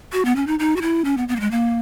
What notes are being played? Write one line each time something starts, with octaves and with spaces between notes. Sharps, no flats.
F#4
B3
C#4
D#4
D#4
F#4
E4
C#4
B3
B3
A#3
G#3
A#3